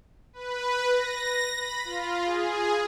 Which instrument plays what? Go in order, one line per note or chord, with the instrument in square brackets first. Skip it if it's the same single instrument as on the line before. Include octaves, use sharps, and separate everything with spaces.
[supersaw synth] B4
A#6
B5
F4
G#4